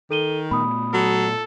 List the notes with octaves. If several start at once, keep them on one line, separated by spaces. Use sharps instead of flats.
D#3 A4 D#7 G7
A#2 A3 B3 B5 D#6
F#3 A4